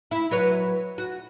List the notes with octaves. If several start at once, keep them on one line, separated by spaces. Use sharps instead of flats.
E4
F#3 B4 C#5
F#4